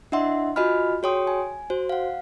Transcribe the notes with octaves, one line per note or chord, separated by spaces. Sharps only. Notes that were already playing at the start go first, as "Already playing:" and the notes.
D4 E4 D#5 E5 F#5 C6
F4 F#4 D#5 G#5 B5 F6
F#4 G#4 C#5 G5 C6 D#6
G#5
F#4 C5
F5 F#5